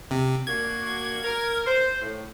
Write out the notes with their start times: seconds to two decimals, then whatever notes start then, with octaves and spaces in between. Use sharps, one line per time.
0.11 C3
0.47 A#3 D4 F#4 G#6
1.24 A#4
1.67 C5
2.02 A2